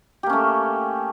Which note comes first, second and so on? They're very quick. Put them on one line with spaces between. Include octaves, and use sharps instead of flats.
G4 A#3 C#4 A3